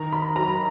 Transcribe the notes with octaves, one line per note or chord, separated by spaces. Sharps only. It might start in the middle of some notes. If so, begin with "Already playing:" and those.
Already playing: D#3 A#5
B5
F#3 A#5